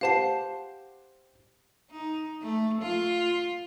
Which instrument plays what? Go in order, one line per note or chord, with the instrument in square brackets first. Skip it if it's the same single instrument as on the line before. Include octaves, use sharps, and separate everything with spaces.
[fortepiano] G4 C5 F#5 [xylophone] F5 A5 C7
[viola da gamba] D#4
A3
F4